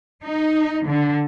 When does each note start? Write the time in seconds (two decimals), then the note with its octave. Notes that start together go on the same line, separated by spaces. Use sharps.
0.23 D#4
0.86 D3